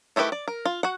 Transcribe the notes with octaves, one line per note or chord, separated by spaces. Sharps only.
D#3 A3 E4 G4 B4
D5
A#4
F4
F#4 F#5